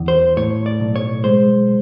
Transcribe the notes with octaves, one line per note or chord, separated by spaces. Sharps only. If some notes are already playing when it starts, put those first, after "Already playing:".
Already playing: E2
C5
A2 C#5
D5
B1
C#5
G#3 C5